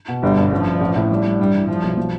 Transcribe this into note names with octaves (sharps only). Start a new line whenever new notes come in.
B2
G1 G3
G2
A1 F3
A1
A1
A2
G3
G3
G2 G3
E3
F3 G3
B1
F3